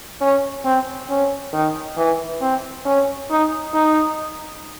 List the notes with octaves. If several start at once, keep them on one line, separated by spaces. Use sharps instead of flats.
C#4
C4
C#4
D#3
E3
C4
C#4
D#4
D#4